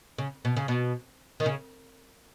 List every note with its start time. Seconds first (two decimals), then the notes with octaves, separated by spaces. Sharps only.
0.18 C#3
0.45 B2
0.57 C#3
0.68 B2
1.40 D#3
1.46 C#3